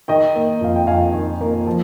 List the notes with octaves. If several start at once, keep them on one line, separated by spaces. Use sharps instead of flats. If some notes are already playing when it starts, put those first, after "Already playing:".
D#3 D#5 G5
A#3
F2 F5
G5
F2 F5 G#5
D#3
A#3
F3